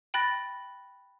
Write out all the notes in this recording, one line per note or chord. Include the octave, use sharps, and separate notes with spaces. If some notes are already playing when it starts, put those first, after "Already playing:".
G5 B5 F#6 A6 A#6